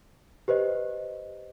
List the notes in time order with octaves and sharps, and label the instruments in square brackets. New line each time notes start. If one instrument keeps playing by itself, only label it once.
[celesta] G4 B4 C5 D#5